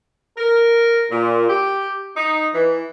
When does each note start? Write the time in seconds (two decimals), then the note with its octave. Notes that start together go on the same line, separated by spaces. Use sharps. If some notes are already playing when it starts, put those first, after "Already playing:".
0.38 A#4
1.11 A#2
1.48 G4
2.17 D#4
2.53 E3